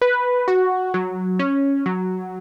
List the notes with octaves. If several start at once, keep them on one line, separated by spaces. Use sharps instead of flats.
B4
F#4
F#3
C#4
F#3